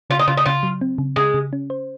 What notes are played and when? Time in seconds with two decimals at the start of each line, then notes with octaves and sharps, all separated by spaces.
0.10 C#3 F4
0.19 D#4
0.28 C#3 F4
0.37 D#4
0.46 C#3 F4
0.63 F#3
0.81 C4
0.98 C#3
1.16 C#3 G#3
1.34 C#3
1.53 C#4
1.70 C5